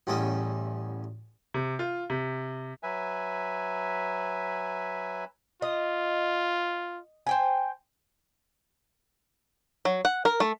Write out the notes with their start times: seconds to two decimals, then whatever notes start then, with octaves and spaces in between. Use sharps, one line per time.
0.07 A1 E2 G3 C#4 D#5 E5
1.54 C3
1.79 F4
2.10 C3
2.83 F#3 B4 E5 G#5
5.62 F4 D#5
7.27 C5 G5 G#5
9.85 F#3
10.05 F#5
10.25 A#4
10.40 A3